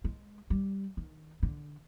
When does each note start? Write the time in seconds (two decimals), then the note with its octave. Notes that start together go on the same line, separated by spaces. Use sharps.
0.04 G#3
0.50 G3
0.97 D#3
1.43 D3